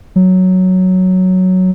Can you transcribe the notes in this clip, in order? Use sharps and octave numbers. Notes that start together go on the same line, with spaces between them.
F#3